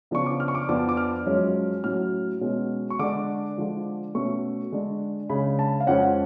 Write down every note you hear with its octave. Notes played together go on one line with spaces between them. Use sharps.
C#3 F3 B3 D4 C#6
D6
F6
C#6
D6
F2 F3 B3 D4 D6
D6
F6
F#2 F3 G#3 C#4
A2 F#3 C#4 F6
B2 G#3 C#4
C#6
D3 G#3 D4 D6
D3 F3 G#3
B2 A3 C#4 C#6
D3 G#3 D4
C#3 G#3 D4 B5
A5
F5
F2 F3 G#3 C#4 F#5